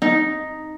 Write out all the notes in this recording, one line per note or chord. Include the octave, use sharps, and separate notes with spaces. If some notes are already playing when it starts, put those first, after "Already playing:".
D#4